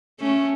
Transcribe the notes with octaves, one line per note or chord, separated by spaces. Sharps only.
A3 C#4